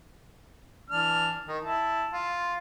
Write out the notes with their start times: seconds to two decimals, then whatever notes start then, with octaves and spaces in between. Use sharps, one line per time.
0.90 E3 D4 F6
1.48 D#3
1.61 E4 A5
2.13 F4